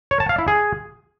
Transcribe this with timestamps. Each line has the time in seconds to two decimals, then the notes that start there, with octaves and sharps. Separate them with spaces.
0.11 C#5
0.20 A5
0.29 F5
0.38 E4
0.48 G#4